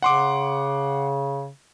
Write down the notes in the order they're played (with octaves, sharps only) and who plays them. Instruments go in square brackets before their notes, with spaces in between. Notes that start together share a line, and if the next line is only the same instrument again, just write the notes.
[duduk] C#3 [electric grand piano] F#5 C6 D6